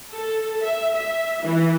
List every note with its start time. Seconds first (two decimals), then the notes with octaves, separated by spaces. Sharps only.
0.10 A4
0.63 E5
0.94 E5
1.44 E3